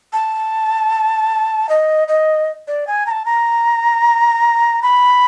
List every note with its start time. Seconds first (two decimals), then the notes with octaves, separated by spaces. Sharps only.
0.13 A5
1.69 D#5
2.08 D#5
2.68 D5
2.87 G#5
3.06 A#5
3.11 A5
3.26 A#5
4.83 B5